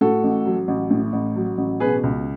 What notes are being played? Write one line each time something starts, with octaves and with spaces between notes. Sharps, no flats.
A2 F#4 A4
A1
F#3
A1
A2
A1
F#3
A1
B2 G#4 B4
C#2